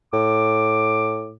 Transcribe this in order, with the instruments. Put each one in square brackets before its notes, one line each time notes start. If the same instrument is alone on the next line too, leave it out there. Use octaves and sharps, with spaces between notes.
[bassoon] A2 [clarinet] D6